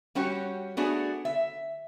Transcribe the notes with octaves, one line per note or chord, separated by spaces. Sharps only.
G3 C#4 F#4 G4 C#5
A3 B3 D4 F#4 G#4
E5